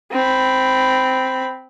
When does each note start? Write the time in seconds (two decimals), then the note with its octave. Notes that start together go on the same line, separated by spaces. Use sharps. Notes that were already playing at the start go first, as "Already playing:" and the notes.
0.12 C4 B5